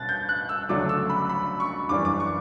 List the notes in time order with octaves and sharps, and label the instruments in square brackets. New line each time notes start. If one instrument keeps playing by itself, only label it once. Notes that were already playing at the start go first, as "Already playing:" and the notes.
Already playing: [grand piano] B2 C#4 F#6 A6
G6
F#6
E6
D2 C#3 F#3 A3 D4 D6
E6
B5
B5
C#6
F#2 E3 G3 D4 D6
D6
C#6